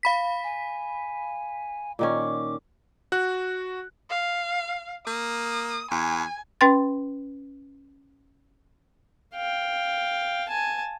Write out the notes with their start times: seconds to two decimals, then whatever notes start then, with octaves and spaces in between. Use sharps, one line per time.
0.03 F5 B5 B6
0.44 G#5
1.99 A#2 D#3 C#4 D6
3.12 F#4 F#6
4.10 F5
5.07 A#3 D#6
5.91 E2 G#5
6.61 C#4 B4 G5 C6 A6
9.34 F5 G5
10.49 G#5 A5